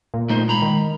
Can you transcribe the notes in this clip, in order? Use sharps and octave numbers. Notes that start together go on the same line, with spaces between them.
A#2
A3 D#4 C5
G#3 A#5 B5
D#3